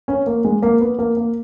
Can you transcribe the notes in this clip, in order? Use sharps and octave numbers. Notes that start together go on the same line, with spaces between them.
C#4
A#3
G#3
A#3
B3
A#3
A#3